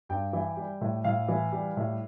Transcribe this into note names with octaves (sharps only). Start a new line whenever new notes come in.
G2 G5
E3
G3
A2
A2 F5
E3
G3
A2